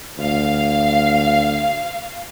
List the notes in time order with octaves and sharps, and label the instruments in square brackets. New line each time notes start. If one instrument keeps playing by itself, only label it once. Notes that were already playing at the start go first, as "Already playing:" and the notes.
[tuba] D2 [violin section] F5